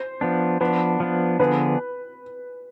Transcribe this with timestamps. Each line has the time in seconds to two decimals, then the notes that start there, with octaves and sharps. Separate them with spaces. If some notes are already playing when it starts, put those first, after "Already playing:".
Already playing: C5
0.21 F3 B3 D4
0.61 F3 B3 D4 B4
1.00 F3 B3 D4
1.39 D3 F3 B3 D4 G#4 B4